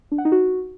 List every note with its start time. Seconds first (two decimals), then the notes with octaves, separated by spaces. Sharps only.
0.12 D4
0.18 F#5
0.25 D#4
0.32 F#4